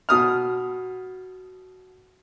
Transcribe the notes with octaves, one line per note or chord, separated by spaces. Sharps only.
B2 D#6 F6